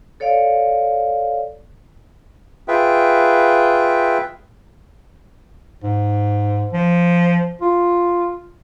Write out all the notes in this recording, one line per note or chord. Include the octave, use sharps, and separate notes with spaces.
A4 C#5 D5 F5
F4 G#4 B4 E5 G5
G#2
F3
F4